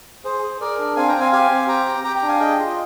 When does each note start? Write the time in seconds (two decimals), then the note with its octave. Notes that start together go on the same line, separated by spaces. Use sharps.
0.24 G#4 C5
0.43 G#4
0.60 G#4 A#4 D5
0.79 D4
0.96 C4 F5 G#5
1.08 G5 A#5
1.15 C4
1.20 F5 G#5
1.32 G4 F5 G#5
1.51 C4
1.68 G4 G5 A#5
1.86 G4
2.04 G4 G5 A#5
2.16 G5 A#5
2.22 D4
2.28 F5 G#5
2.40 G#4 D#5 G5
2.58 F4
2.70 D#5